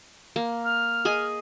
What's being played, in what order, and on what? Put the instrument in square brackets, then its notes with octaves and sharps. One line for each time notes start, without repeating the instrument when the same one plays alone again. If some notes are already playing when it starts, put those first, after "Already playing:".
[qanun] A#3
[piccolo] F6
[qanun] G#4 D#5 G#5